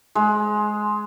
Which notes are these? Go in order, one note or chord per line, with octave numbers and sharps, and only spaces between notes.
G#3